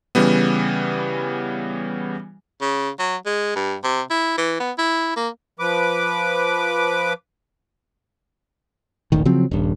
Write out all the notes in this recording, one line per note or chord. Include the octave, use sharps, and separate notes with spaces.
C#3 E3 G3 B3
C#3
F#3
G#3
G2
C3
E4
E3
B3
E4
A#3
F3 B4 D6
D#1 A1 D#3
C#3 F3 F#3 C4
D#1 G2